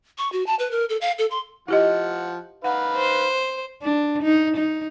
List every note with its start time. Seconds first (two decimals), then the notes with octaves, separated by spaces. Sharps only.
0.18 C#6
0.32 F#4
0.46 A5
0.59 B4
0.71 A#4
0.89 A4
1.01 F5
1.18 A4
1.31 C6
1.68 F3 E4 G4 D#5 F#5
2.64 D#4 B4 F5 F#5
2.96 C5
3.82 D4
4.23 D#4
4.57 D#4